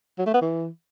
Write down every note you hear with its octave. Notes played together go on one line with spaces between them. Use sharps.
F#3
A3
B3
E3